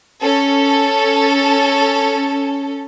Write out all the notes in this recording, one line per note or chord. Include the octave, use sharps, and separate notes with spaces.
C#4 A4